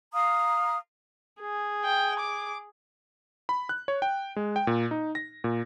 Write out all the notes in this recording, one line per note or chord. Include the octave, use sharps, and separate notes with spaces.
F5 A#5 D#6 F6
G#4
G5
D6
B5
F#6
C#5
G5
G#3
G5
A#2
D#4
A#6
A#2